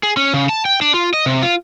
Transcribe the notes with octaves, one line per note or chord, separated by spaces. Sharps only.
G#4
C#4
C#3
A5
G5
D4
F4
D#5
C3
F4